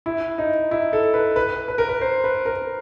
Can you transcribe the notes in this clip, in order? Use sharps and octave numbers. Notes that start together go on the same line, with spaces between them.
E4
D#4
E4
A4
B4
B4
B4
A#4
B4
C5
B4
A#4